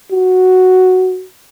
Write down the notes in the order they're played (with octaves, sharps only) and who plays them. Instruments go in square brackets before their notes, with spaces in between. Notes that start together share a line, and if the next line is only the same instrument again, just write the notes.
[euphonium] F#4